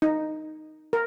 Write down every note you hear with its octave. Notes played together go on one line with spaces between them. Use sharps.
D#4
A#4